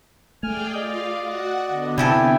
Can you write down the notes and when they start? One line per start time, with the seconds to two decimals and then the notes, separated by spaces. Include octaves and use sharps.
0.43 A3 G#4 D5 G5 G#5 F6
0.74 F4 D5 D#5 F5
1.18 F#4 F#5
1.68 D3 B3
1.98 C3 G3 E4 A4 E5 G5 G#5